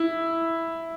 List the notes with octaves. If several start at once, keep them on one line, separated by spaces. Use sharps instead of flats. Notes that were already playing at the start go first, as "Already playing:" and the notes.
Already playing: E4